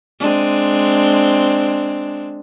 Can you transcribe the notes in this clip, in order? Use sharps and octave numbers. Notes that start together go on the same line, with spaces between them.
G#3 C4 D4